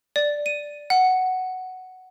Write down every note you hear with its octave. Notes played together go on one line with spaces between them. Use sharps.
D5
D#7
F#5